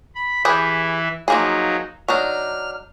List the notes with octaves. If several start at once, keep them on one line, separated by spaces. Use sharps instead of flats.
B5
E3 E4 G4 G#4 B4
F3 F#3 A#3 D#4 G#4
F#3 D4 D#4 F6